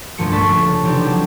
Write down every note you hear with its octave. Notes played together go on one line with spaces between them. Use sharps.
G1 C2 G2 F3 A3 C#7
F1 A#1 A3 A5 C#6 B6
C#3 A5
C3 E3 C4 D4 D#4 G4
F3 F#3